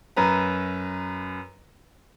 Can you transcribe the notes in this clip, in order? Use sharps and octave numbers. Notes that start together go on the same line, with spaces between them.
F#2 B4 A#5